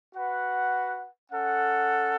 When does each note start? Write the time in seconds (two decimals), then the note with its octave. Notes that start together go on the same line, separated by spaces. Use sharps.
0.13 F#4 B4 F#5
1.31 C#4 A4 F#5